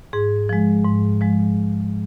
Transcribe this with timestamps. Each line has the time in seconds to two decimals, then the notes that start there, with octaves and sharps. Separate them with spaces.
0.13 G#2 G#4
0.49 F3 G#3
0.85 G#2
1.21 F3 G#3